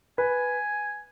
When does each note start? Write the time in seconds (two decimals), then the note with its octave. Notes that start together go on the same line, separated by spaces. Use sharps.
0.18 B4 G#5